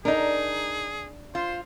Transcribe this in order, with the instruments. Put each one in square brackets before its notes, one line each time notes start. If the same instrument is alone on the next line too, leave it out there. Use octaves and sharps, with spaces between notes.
[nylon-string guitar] D4 [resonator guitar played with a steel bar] D#4 A#4 [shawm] G#4
[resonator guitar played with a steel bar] F4 [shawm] C5